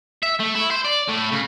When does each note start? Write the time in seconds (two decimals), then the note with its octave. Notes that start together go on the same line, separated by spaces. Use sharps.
0.23 E5
0.39 A3
0.55 E4
0.71 C5
0.85 D5
1.09 A2
1.32 C#3